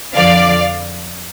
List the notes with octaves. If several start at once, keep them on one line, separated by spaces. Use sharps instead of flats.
F2 D3 F3 D5 F5